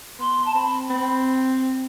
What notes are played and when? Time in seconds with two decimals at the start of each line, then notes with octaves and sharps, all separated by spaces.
0.19 B3 C6
0.45 A5
0.54 C4 B5
0.90 C4 B5